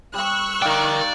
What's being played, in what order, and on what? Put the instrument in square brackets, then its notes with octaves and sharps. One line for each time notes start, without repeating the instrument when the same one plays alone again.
[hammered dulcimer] G3 [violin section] C#6 E6 F#6
[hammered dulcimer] D#4 F5 [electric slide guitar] A#4 G5 [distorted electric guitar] D5